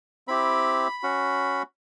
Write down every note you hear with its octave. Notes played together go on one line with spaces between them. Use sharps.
C4 E4 G4 B5
C#4 F#4